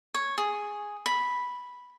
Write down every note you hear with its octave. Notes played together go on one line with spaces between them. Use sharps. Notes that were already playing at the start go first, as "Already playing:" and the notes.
C#5
G#4
B5